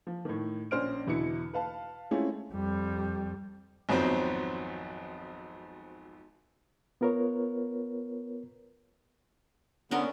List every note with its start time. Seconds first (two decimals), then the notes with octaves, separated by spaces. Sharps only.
0.07 F3
0.25 A2 D#3
0.71 A#1 C#4 C5 F6 D7
1.07 E2 B2 D3 E4 C#7
1.53 B4 F5 A5
2.11 G#3 A3 C4 C#4 E4 F4
2.53 F2 G3
3.89 G#1 F2 F#3 B3 C4 C5
7.01 B3 F4 A#4 B4 C#5
9.91 D3 B3 C#4 D4 A#4